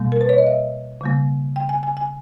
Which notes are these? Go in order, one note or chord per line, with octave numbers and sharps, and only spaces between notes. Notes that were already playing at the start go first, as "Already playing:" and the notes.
Already playing: B2 G3 A#3
A#4
B4
C#5
D#5
E5
C#3 G3 A#3
G5
G#5
G#5
G#5